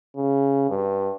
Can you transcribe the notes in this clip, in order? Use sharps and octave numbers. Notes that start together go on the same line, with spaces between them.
C#3
G2